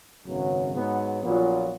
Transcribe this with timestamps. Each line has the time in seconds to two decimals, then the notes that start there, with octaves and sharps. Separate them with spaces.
0.25 G#1 F#2 C#3 F#3 B3
0.73 G#2 F#3 B3
1.22 A#1 A#2 F#3 B3 F4